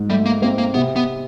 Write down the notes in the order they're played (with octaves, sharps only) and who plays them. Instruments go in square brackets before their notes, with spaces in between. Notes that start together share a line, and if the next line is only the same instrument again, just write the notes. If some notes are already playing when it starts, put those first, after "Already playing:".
Already playing: [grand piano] G#2
[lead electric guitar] G3 [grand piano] A3
[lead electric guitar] A#3
[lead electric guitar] A#3 [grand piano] C4
[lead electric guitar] A#3
[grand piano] C3 [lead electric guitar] B3
[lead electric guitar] B3